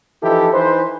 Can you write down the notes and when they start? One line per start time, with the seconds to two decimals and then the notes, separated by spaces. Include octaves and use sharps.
0.23 E3 F3 D#4 E4 G4 A4
0.53 E3 D#4 B4 C5